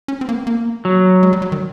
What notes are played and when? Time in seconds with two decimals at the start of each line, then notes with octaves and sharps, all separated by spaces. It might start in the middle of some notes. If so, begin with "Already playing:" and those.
0.08 C#4
0.21 C4
0.29 A#3
0.34 B3
0.47 A#3
0.85 F#3
1.23 G#3
1.33 G3
1.42 F#3
1.52 D#3